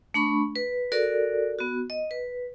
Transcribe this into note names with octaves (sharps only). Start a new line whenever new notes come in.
A3 D4 B5 C#6
B4
F#4 A4 A#4 D5
B3 F#4
D#5
B4